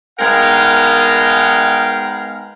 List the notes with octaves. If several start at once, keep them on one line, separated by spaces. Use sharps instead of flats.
G#3 B3 D#4 A#4 F5 G5